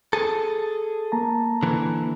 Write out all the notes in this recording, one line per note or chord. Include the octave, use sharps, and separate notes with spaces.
G#4 A4
A#3 A5 A#5
D3 E3